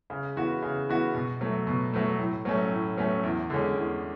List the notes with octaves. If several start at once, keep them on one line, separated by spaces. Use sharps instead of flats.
C#3
E3 B3 F#4
C#3
E3 B3 F#4
B2
F#3 A3
B2
F#3 A3
A2
F#3 A3 C#4
A2
F#3 A3 C#4
E2
D3 G#3 C#4
E2